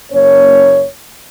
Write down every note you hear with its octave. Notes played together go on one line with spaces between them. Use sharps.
F#1 A#3 C#4 C#5